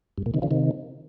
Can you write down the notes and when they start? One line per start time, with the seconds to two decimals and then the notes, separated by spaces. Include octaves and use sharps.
0.18 G2
0.26 A#2
0.34 C3 D#3
0.42 D3 F3
0.51 C3 D#3